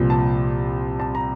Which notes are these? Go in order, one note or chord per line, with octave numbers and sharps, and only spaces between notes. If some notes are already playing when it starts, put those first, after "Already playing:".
Already playing: C2 A#2 F3
A5
A5
A#5